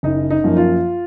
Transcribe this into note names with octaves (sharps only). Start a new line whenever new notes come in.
F#1 D#4
D#4
F#2 F3 A#3
F4